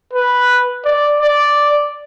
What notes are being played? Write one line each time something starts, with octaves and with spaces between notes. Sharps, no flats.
B4
D5
D5